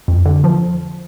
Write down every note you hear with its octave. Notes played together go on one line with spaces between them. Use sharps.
F2
D3
F3